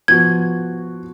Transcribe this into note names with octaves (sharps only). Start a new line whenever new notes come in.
F3 B3 F#4 G#6